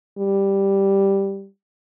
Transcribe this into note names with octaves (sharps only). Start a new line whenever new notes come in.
G3